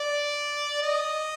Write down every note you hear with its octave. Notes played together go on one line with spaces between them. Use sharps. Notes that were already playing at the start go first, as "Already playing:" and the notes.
Already playing: D5
D#5